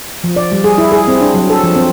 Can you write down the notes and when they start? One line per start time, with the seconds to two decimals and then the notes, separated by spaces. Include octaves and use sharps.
0.24 F3
0.36 D5
0.52 G3
0.64 G#4
0.78 E4
0.92 G#4
1.08 C4
1.21 D4
1.34 F#3
1.50 A4
1.63 F3
1.76 C4